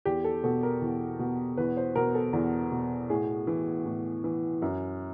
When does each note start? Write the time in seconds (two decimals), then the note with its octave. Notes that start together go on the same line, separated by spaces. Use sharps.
0.05 E2 G4
0.24 A4
0.43 B2 A4
0.63 A#4
0.81 E2
1.19 B2
1.57 E2 B4
1.77 C5
1.95 B2 A#4
2.15 A4
2.33 E2
2.72 B2
3.10 A2 G#4
3.47 E3
3.85 A2
4.24 E3
4.62 F#2